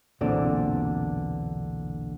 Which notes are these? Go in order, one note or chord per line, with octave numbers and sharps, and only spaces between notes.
B1 E2 A#2 D3 C4 D5